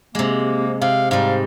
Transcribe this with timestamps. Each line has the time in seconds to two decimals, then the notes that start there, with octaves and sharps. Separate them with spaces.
0.15 C3 G#3 A#3
0.82 C3 F5
1.11 G#2 G3 F5